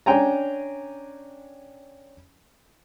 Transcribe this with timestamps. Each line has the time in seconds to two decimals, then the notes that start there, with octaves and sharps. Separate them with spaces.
0.06 C#4 D4 G5 G#5 A#5